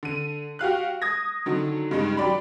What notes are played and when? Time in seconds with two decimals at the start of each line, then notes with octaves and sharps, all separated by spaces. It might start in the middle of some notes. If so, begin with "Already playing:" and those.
0.03 D3 D#7
0.59 F#4 G4 F5 F#6
1.02 D#6 G#6 A#6
1.46 D3 D#3 F#3
1.91 G2 C#3 G#3 D#4
2.17 F#3 G4 D5 B5